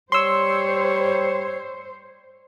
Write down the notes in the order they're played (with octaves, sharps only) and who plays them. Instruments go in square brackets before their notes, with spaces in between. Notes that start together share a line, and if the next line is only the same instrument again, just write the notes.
[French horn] G3 [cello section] C5 [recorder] C#5 [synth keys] C6 E6